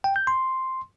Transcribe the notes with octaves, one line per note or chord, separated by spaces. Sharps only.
G5
G6
C6